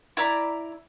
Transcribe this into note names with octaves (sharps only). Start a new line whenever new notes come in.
E4 D5 A#5 B5